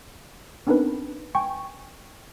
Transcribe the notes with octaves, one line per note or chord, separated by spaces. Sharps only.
B3 C4 D4 D#4 A#4 B4
G5 G#5 C#6